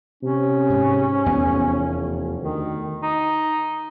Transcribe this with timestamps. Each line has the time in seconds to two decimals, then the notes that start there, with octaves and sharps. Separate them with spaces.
0.23 C3 C#4
0.70 G#2
1.26 F1 E2 B3
2.43 D2 D#3
3.03 D#4